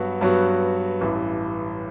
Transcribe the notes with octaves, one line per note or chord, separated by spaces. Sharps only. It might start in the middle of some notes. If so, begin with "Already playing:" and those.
Already playing: G2 F#3 B3 F#4
G2 F#3 B3 F#4
A1 G2 E3